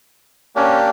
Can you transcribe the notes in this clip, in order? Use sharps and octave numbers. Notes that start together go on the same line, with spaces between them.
A#3 C#4 D4 G4